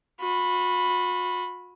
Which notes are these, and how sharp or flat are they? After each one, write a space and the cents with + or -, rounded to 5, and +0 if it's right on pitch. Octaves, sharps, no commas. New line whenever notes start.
F#4 -45 B5 +0